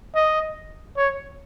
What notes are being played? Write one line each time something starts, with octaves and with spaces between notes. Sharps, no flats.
D#5
C#5